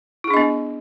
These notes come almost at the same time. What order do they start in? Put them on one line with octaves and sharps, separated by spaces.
E4 G#4 D4 D#5 B3